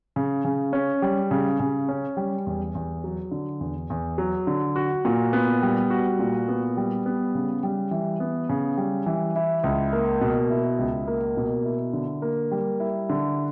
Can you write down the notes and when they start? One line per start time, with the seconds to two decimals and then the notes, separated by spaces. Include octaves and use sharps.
0.16 C#3
0.45 C#3
0.73 C#4
1.02 G3
1.31 C#3
1.60 C#3
1.89 C#4
2.17 G3
2.46 E2
2.75 E2
3.04 F#3
3.31 D3
3.60 E2
3.90 E2
4.18 F#3
4.47 D3
4.76 F#4
5.05 A#2
5.33 B3
5.62 G3
5.91 F#4
6.19 A#2
6.48 B3
6.77 G3
7.06 B3
7.35 C#3
7.63 G3
7.91 E3
8.20 B3
8.49 C#3
8.77 G3
9.06 E3
9.36 E4
9.64 C#2
9.93 A#3
10.21 B2
10.51 E4
10.79 C#2
11.07 A#3
11.37 B2
11.65 E4
11.93 D3
12.22 A#3
12.51 G3
12.80 E4
13.10 D3